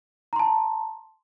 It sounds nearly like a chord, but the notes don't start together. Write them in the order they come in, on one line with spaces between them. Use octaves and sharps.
A#5 C6 A5